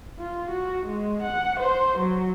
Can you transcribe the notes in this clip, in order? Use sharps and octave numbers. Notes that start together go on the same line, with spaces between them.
F4
F#4
G#3
F#5
C5
F#3